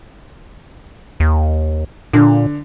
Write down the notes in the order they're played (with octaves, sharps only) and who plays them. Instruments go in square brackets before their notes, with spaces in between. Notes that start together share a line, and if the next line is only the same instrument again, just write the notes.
[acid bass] D#2
[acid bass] A#2 [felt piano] D3